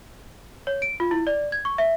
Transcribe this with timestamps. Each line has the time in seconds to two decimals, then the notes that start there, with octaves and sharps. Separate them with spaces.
0.67 C#5
0.82 D7
1.00 F4
1.11 E4
1.27 D5
1.52 G#6
1.65 C#6
1.78 E5